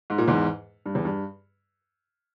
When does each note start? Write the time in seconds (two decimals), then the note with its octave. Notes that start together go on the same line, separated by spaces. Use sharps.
0.10 G#2
0.18 A#2
0.28 E2 G#2
0.86 G2
0.95 E2
1.05 G2